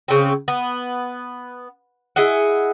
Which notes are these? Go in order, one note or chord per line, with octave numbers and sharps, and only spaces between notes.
C#3 C4
B3
E4 G#4 D#5 F#5